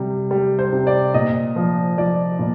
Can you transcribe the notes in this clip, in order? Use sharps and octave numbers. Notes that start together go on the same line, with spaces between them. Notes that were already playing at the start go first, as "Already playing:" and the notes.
Already playing: C3 G3
G3
C5
C3
D5
A#2 D#5
F3
F3 D5
A#2